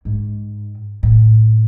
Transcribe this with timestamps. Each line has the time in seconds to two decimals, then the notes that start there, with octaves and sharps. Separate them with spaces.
0.05 G#2
1.03 A2